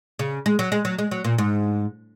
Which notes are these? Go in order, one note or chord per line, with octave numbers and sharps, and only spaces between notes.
C#3
G#3
F#3
G#3
F#3
G#3
F#3
A#2
G#2